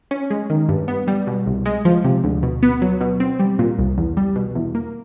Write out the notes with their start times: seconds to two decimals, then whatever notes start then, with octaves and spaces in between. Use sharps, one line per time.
0.11 C#4
0.30 G#3
0.50 D#3
0.69 G2
0.88 B3
1.08 G3
1.27 B2
1.46 C2
1.65 G#3
1.85 F3
2.04 C3
2.24 D2
2.43 B2
2.63 B3
2.82 F#3
3.01 B2
3.20 C4
3.39 G3
3.59 A#2
3.78 C2
3.98 E2
4.17 G3
4.36 B2
4.55 E2
4.75 A#3